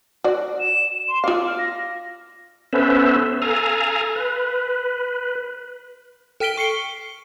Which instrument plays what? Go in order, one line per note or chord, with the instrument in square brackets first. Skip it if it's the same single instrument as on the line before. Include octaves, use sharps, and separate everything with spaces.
[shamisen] F#4 D5
[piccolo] E7
C6
[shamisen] F4 F5 [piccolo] D6
[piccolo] F6
A#6
[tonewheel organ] B3 C#4 A4 B4 C5 E5
A4 F5 G#5 A#5
B4
[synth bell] A4 G5 F6 B6 D7 G7
C#6 C7 C#7 G7